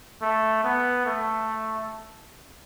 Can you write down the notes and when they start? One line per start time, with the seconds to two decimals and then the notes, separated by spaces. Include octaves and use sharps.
0.22 A3
0.64 B3
1.06 A3